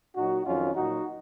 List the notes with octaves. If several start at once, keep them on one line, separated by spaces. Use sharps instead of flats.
A#2 F#3 D#4 F#4
F2 D#3 F#3 C#4 F4
A#2 F#3 D#4 F#4